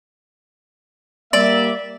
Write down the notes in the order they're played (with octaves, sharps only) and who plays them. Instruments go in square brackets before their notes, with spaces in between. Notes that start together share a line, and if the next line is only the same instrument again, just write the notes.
[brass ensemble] G3 A#3 E5 [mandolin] D5